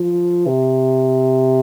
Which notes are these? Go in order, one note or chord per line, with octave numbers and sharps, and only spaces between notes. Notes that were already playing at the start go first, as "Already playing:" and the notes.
Already playing: F3
C3